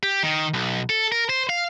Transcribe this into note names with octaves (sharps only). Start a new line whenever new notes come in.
G4
D#3
B1
A4
A#4
C5
F5